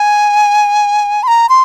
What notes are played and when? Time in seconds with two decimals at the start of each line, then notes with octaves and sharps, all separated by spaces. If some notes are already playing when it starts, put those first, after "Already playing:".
Already playing: G#5
1.23 C6
1.28 A#5
1.49 C6